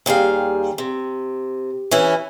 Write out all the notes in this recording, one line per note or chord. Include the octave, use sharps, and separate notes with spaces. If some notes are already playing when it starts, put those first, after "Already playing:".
D#2 G3 G#4 F5
C3
E3 C#4 E4